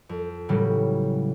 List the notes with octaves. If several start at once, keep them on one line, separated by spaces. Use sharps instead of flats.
F2
A2 C#3 E3 F#3 G3